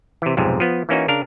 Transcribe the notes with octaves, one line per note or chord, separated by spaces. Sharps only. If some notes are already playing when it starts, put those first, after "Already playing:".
C3 E3
B1 F2 G#2 C3
F3 B3
E3 A#3 C#4 D#4 F#4
C#3 D4 A#4 F5